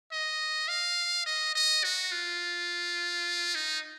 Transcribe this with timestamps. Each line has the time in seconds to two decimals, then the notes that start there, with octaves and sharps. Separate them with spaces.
0.12 D#5
0.68 F5
1.26 D#5
1.55 D#5
1.83 F#4
2.12 F4
3.55 D#4